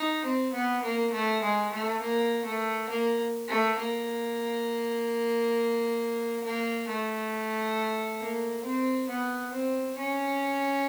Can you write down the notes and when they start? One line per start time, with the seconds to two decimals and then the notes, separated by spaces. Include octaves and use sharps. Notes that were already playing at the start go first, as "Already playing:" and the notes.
Already playing: D#4
0.24 C4
0.53 B3
0.83 A#3
1.13 A3
1.43 G#3
1.72 A3
2.01 A#3
2.45 A3
2.89 A#3
3.48 A3
3.78 A#3
6.44 A#3
6.88 A3
8.20 A#3
8.64 C4
9.09 B3
9.53 C4
9.97 C#4